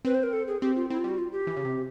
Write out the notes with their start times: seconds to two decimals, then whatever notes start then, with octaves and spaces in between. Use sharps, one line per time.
0.05 C4 B4
0.15 C5
0.23 A#4
0.33 A4
0.48 G#4
0.61 C4 G4
0.76 F4
0.90 C4 E4
0.99 F4
1.04 G3 F#4
1.18 F4
1.32 G4
1.47 E3
1.57 C#3
1.65 C3